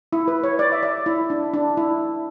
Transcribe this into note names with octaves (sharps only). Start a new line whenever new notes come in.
E4
B4
C#5
D5
E5
D5
E4
D4
D4
E4